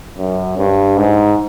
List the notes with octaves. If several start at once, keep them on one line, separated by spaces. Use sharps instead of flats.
F#2
G2
G#2